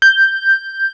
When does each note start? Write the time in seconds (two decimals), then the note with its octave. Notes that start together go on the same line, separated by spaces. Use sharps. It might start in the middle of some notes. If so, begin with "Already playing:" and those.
0.02 G6